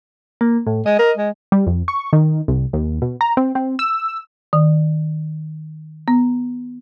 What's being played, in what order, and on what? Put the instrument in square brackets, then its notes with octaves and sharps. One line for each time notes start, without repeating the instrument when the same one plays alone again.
[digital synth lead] A#3
A2
[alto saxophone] G#3 [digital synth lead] D#5
[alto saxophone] A#4
G#3
[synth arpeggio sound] G3
F2
C#6
D#3
C2
D#2
B2
A#5
C4
C4
E6
[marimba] D#3
B3